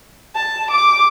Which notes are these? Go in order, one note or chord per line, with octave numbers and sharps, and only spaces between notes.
A5
D6